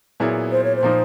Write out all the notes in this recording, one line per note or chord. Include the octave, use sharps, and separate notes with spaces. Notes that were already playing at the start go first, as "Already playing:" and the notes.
A#2 F#3 B3 E4 G#4
C5
C#5
C5
A#2 F3 A#3 D#4